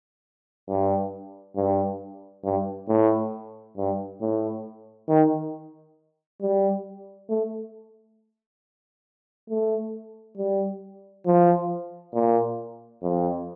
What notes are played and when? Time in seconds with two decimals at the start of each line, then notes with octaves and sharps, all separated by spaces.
0.69 G2
1.56 G2
2.44 G2
2.89 A2
3.77 G2
4.21 A2
5.09 D#3
6.41 G3
7.29 A3
9.50 A3
10.37 G3
11.26 F3
12.14 A#2
13.03 F2